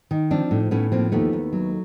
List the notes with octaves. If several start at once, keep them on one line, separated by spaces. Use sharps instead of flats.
D#3
F3 C4 D4
A2
A2 B3 C#4
F3 A#3 C4
D#2 A3 B3
D#2
F#3